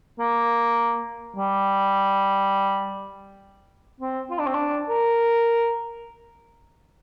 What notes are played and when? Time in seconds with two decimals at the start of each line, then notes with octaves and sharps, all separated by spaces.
0.20 A#3
1.36 G3
4.01 C4
4.31 F4
4.39 D4
4.46 C4
4.54 D4
4.89 A#4